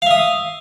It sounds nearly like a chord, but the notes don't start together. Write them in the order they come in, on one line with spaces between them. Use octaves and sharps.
F5 E5 D#6